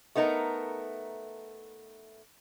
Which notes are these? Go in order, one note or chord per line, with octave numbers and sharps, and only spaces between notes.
A3 B3 D#4 A#4